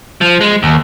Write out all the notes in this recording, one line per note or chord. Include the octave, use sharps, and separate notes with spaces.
F3
G#3
D#2